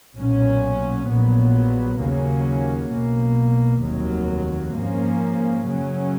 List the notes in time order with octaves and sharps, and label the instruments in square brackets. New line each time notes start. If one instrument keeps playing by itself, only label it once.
[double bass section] B1 A#2 F#3 C#4
A#1 A#2 F#3 B3
D#2 C#3 F#3 A#3 C#4
B1 B2 A#3
F1 D#2 D#3 F#3
G#2 F3 A#3 C#4
F#2 C#3 F#3 C#4